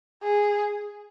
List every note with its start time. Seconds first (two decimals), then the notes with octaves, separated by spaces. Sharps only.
0.23 G#4